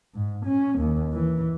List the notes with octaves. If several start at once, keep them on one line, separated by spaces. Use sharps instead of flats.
G#2
C#4
D#2
E3